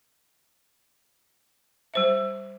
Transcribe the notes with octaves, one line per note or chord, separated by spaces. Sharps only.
G3 C5 E5